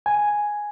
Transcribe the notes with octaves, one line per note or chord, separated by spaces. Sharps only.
G#5